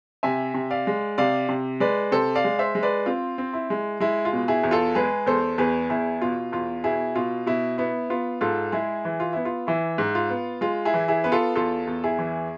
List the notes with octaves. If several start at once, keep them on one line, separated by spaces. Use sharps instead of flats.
C3 E5 G#5
C3
D5 F5
G#3
C3 D5 F5
C3
G#3 B4 D5
C3 A4 C5
D5 F5
G#3
C5 E5
G#3
B4 D5
C4 F4
C4
E4
G#3
G#3 E4
F4
B2
E4 G#4
E2
F4 A4
G#3 G#4 B4
E2 A4 C5
E2 G#4 B4
E2 E4 G#4
B2 F4
E2 F4
B2 E4 G#4
B2 F4
B2 E4
B3 E4
B3 F4
G#2 F4 A4
G#3 E4 G#4
E3
F4
B3 E4
F4
E3 E4
G#2
F4
B3
G#3 F4
E4 G#4
E3
E4 G#4
B3 B4
F4 A4
E2 F4 A4
E2
E4 G#4
E3